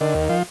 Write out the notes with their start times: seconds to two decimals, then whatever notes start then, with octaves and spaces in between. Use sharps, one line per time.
0.01 D3 D#3
0.15 D#2
0.29 F3